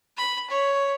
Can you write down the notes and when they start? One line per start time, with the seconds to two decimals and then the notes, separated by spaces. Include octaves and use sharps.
0.17 B5
0.50 C#5